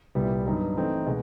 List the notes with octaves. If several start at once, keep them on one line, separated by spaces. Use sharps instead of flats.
C2 A#2 G3 B3 E4
G2 D#3 F#3 B3 D#4
E3 A3 C4 D#4
B2 G#3